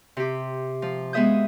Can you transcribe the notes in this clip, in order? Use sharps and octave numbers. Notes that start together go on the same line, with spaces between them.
C3 G4
F3
G#3 B3 G#4 E5 D#6 G6